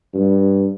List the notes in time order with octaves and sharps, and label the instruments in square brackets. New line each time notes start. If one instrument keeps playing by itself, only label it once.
[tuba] G2